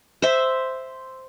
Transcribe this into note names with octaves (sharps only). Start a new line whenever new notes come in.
C5 E5